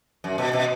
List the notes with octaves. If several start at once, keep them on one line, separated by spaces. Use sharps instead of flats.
F#2
B2
B2